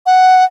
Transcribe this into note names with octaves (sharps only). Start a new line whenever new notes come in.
F#5